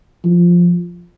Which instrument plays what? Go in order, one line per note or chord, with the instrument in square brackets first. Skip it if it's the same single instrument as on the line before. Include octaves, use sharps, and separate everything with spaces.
[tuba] F3